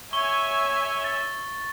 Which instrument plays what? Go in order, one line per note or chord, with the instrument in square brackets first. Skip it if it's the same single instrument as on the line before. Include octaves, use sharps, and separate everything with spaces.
[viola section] C#5 E5 G#5 [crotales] C#6 G7
[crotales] A6